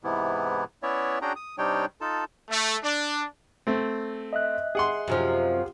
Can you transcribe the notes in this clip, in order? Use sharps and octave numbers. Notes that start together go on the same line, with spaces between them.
G#2 C3 E3 B3 E4
B3 C#4 E4 C#5 D5 E5
C#4 D4 F#4 G#4 G5 A#5
D#6
C3 G3 D4 D#4 C#5 G5
D#4 F4 A4 A5
A3
D4
A3 C4
D#5 E5 F#6
G#4 F#5 C6
F#2 C3 F3